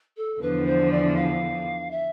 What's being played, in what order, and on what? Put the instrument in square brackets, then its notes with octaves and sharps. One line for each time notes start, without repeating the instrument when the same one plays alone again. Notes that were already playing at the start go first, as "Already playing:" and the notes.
[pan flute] A4
[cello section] E2 D3 F3 [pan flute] B4
[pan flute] C5
D5
F5
E5